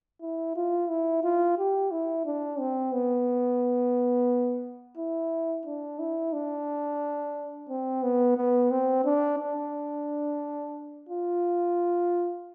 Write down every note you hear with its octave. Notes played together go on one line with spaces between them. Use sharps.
E4
F4
E4
F4
G4
E4
D4
C4
B3
E4
D4
E4
D4
C4
B3
B3
C4
D4
D4
F4